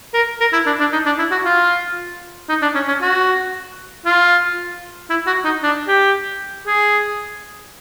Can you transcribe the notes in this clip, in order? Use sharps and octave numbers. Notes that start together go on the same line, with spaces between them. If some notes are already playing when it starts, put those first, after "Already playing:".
A#4
A#4
E4
D4
D4
D#4
D4
E4
F#4
F4
D#4
D4
C#4
C#4
F#4
F4
E4
F#4
D#4
D4
G4
G#4